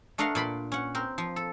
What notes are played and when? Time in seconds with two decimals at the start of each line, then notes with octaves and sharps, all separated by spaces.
0.18 A3 D4 A#4 D#5 F5 F#5
0.35 A#2 D5 B5 C6
0.72 C#4 F#5
0.95 C4 A#4
1.18 F3
1.36 A4